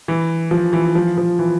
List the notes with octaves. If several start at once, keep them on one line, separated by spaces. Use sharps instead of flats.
E3
F3
E3
F3
F3
E3